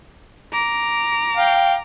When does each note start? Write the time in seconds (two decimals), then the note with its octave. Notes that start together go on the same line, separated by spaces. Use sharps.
0.52 A#5 D6
1.37 F5 G5